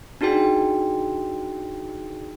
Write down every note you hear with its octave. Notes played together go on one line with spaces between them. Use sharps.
D4 D#4 F#4 G#4 G5